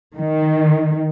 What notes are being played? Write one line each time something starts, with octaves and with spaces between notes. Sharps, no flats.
D#3